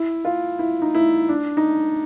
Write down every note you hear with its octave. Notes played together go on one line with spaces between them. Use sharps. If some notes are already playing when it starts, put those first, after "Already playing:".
Already playing: E4
F4
E4
D#4
E4
D4
D#4